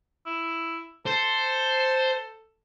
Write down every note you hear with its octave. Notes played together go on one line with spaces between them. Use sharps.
E4
A4 C5